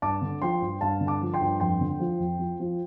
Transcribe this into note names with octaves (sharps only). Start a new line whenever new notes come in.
G2 A5 D6
D3
F3 G5 C6
G2
G2 F5 A5
D3
A5 D6
F3
G5 C6
G2
F2 G5 C6
D3
F3
F2
F3
F3